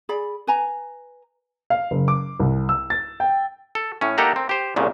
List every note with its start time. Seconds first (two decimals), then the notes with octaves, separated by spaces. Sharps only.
0.09 G#4 D5 B5
0.47 B4 G#5 A#5
1.70 F5
1.91 F#1
2.08 D6
2.40 C2
2.69 E6
2.90 A6
3.20 G5
3.75 A4
4.01 A2 C#4
4.18 A#3 D#4 G4 A4 F#5 A#5
4.36 C4
4.49 G4 C5
4.76 C2 A#2 C#3